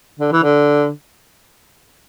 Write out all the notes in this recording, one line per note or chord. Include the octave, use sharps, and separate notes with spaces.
D3
E3
D3